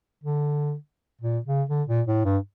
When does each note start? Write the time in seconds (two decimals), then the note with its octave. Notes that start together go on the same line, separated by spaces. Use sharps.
0.23 D3
1.21 A#2
1.46 C#3
1.69 D3
1.89 A#2
2.07 A2
2.25 G2